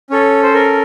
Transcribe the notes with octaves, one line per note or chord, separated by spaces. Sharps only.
C#4 A4 C#5
C5
A#4